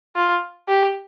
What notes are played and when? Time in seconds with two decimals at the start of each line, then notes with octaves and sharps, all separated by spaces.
0.16 F4
0.68 G4